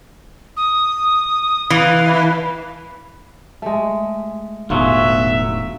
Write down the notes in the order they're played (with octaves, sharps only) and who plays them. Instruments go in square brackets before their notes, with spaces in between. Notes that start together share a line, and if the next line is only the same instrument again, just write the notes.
[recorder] D#6
[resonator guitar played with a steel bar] E3 [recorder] F5
[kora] G#3 A3
[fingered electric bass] E1 A2 D3 [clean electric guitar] B1 F#3 [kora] F4 G#4 [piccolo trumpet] E5